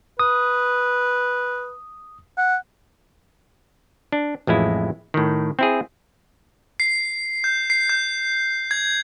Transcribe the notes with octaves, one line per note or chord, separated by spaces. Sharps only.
B4 D#6
F#5
D4
A1 F2 G#3 E4
A2 D#3
C4 E4 G#4
C7
G6
C7
G6
G#6